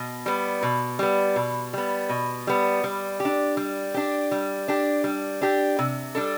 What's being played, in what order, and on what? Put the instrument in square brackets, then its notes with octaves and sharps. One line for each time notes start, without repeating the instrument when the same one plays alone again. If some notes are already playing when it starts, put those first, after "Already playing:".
Already playing: [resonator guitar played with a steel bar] B2
G3 B3
B2
G3 B3
B2
G3 B3
B2
G3 B3
G3
G4
D4
G3
D4 G4
G3
D4 G4
G3
D4 G4
C3
G3 D4 A4